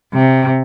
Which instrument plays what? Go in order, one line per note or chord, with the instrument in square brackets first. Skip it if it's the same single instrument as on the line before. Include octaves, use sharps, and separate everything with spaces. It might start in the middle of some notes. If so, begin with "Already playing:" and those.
[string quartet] C3